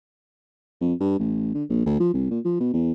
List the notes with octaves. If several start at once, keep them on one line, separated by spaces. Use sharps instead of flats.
F2
G2
A1
D3
A#1
D2
F3
C2
A#2
F3
B2
E2